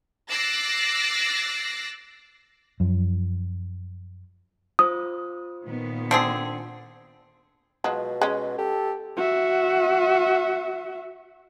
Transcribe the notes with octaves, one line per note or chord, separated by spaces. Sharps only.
D6 E6 F#6 A6 A#6 C7
F#2 F3
F4 C5 D#6
A#2 D#3 B3
D3 C4 G#4
B2 F3 F#3 G#3
G#3 C#4
G4 A4
F#4 E5